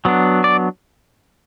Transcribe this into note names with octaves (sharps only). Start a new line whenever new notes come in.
F#3 B3 D4
D5